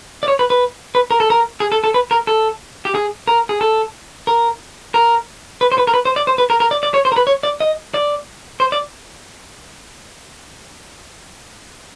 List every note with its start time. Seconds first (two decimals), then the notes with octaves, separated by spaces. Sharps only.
0.23 D5
0.28 C#5
0.39 B4
0.50 B4
0.95 B4
1.11 A#4
1.20 A4
1.30 A#4
1.60 G#4
1.72 A4
1.84 A4
1.94 B4
2.11 A#4
2.27 A4
2.85 G4
2.95 G#4
3.28 A#4
3.49 G#4
3.61 A4
4.27 A#4
4.94 A#4
5.61 B4
5.72 C5
5.78 B4
5.87 A#4
5.94 B4
6.05 C5
6.16 D5
6.27 C5
6.38 B4
6.50 A#4
6.60 A#4
6.71 D5
6.83 D5
6.94 C#5
7.05 C5
7.12 A#4
7.16 B4
7.27 C#5
7.43 D5
7.60 D#5
7.94 D5
8.60 C5
8.72 D5